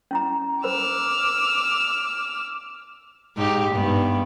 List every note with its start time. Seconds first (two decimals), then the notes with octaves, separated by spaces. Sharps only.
0.11 C#4 E4 A#5
0.64 A#4 C5 B5 D6 E6 F6
3.37 G#2 D#4 G4
3.74 G2 B3